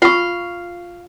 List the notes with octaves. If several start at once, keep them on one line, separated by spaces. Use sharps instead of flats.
F4 F5 C#6